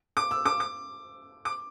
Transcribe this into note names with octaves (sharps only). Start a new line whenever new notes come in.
D6
E6
D6
D6
D6